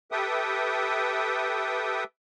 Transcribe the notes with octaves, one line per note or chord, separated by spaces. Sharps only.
G4 A4 B4 E5 G5 D#6